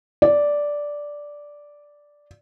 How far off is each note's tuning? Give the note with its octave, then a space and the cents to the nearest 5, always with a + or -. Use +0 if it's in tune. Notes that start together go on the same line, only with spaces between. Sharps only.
D5 -5